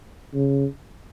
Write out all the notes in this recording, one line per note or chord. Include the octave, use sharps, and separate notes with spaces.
C#3